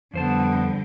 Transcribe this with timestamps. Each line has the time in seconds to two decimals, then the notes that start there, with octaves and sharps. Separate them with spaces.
0.14 F2 D3 G3 B3 C5 A5